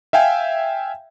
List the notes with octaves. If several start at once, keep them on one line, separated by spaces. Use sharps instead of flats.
E5 F5 G5 G#5